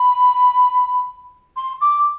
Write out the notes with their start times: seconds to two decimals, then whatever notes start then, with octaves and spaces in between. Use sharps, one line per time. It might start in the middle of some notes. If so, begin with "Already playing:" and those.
Already playing: B5
1.56 C6
1.81 D6